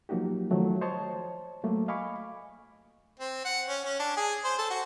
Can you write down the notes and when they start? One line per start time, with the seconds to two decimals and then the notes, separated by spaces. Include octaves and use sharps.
0.09 F3 F#3 A#3 D#4 F#4 G4
0.51 D#3 F3 F#3 A3
0.81 C5 C#5 D#5 A5
1.64 F#3 A3 A#3
1.88 D#5 F5 G#5 B5 C#6 D6
3.20 C4
3.45 F#5
3.68 C#4
3.84 C#4
3.99 D4
4.16 G#4
4.44 C5
4.58 A4
4.70 F#4